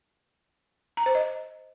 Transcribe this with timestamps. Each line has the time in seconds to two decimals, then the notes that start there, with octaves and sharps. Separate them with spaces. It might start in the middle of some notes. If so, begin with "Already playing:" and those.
0.97 A#5
1.06 C5
1.15 D#5